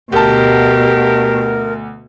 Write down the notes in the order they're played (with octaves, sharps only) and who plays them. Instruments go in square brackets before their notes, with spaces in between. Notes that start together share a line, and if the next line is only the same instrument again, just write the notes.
[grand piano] D2 A5 [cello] B2 [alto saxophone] G4 [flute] A#4